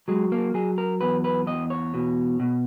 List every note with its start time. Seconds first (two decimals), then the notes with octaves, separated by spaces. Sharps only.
0.08 F#3 G#3
0.32 A#3
0.54 F#3 G#4
0.78 A#4
1.01 E2 B4
1.24 B4
1.47 E2 D#5
1.70 C#5
1.94 B2
2.40 B2